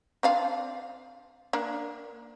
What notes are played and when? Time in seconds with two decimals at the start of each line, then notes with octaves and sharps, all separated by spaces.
0.23 C4 D4 F5
1.53 A#3 D4